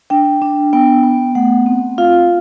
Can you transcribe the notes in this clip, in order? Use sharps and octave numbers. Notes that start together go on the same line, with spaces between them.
D4 G5
D4
B3 G5
B3
A3 F#5
C4
F4 F5